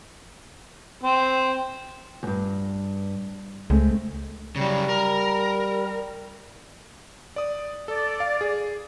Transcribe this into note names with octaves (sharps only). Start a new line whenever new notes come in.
C4
E2 G2
C#2 G#3 A3 C4
C#3 F#3 G3
A#4
D5 D#6
A4 D5
F5
G#4